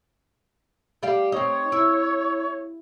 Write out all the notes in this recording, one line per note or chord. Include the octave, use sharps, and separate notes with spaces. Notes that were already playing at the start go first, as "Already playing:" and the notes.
G3 G4 F5
C4 D#4 C#5
E4